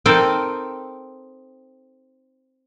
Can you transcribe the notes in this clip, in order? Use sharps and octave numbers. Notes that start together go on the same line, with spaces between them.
C4 D#4 A4 A#4